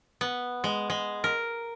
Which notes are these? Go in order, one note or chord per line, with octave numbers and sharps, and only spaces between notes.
B3
G#3
G#3
A#4